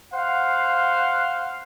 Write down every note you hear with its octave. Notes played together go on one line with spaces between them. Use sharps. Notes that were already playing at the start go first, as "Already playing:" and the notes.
C5 F5 F#5